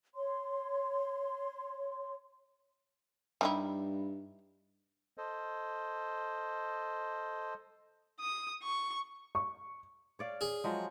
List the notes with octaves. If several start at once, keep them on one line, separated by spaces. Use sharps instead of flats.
C#5 C6
G2 G3 D#4 E4
A4 C5 D#5
D#6
C#6
C#6
C#5 D5 F5
G#4
F3 F#3 G#3